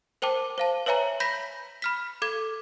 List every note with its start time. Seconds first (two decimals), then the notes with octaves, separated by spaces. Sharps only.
0.22 A#4 C5 G5 A5 D6
0.58 C5 F5 A5
0.86 B4 C#5 E5 G#5 A#5
1.20 B5 G6 A#6 B6
1.82 B5 F6 B6
2.22 A4 D6 G#6